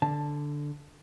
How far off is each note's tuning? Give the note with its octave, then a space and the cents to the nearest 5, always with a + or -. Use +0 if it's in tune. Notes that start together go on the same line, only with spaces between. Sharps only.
D3 +0 A5 +0